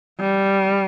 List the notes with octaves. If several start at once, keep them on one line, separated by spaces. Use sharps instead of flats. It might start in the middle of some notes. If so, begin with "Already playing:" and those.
G3